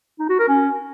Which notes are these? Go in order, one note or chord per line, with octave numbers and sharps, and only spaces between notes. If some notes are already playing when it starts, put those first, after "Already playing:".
D#4
F#4
A#4
C#4